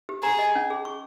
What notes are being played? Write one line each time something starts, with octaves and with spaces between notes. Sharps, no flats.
G4
G#4 A#5
D#5
C#4
G#4
C#6